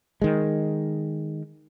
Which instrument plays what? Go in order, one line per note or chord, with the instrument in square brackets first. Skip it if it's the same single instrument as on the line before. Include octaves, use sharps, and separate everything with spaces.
[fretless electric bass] D#3 G#3